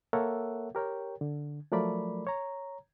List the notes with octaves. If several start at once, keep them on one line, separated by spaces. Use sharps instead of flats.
A#3 A4 A#4 C#5 E5 F#5
G4 A#4 C#5 G5
D3
F3 F#3 A3 A#4 D5 B5
C#5 A#5